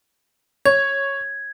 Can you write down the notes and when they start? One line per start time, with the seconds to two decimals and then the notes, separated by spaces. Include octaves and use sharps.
0.65 C#5 G#6